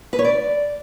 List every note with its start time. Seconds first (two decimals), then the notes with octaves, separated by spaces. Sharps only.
0.13 B4
0.19 C#5
0.25 D5